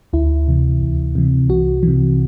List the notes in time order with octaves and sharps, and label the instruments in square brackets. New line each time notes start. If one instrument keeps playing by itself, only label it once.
[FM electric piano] D2 E4
C3 E3
D2
C3 E3
C2 F#4
C3 E3